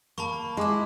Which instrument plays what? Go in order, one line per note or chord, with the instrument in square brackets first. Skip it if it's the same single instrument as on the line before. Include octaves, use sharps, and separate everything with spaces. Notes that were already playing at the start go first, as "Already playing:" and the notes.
[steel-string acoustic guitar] A#3 [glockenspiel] A5 B5 C#6
[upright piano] G#3 [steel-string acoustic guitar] E4 G#4 [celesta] C6 D6